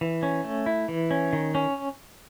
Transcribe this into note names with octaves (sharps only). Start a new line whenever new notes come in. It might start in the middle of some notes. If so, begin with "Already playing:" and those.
E3
C#4
A3
E4
E3
C#4
D#3
C#4